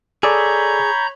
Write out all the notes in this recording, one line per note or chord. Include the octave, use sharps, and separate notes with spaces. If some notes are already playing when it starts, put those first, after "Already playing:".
G#4 A4 C#5 D5 A#5 B5 E6 G6